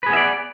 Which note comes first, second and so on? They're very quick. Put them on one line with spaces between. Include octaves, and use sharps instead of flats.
B4 G#4 B3 E5 D5